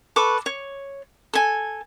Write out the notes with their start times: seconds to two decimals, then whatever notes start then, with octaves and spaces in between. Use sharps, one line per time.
0.16 A4 B4 C#6 D6
0.46 C#5
1.34 A4 G#5